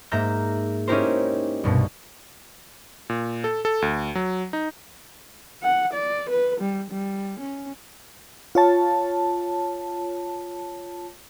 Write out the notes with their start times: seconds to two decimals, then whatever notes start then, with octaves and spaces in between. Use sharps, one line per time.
0.11 G#2 A#3 E5 A#5 G6 A#6
0.88 C#4 D#4 E4 G4 A#4 C5
1.64 C2 G2 B2
3.10 A#2
3.44 A4
3.65 A4
3.82 D2
4.15 F#3
4.53 D#4
5.62 F#5
5.93 D5
6.30 B4
6.60 G3
6.91 G3
7.39 C#4
8.55 F4 C#5 A5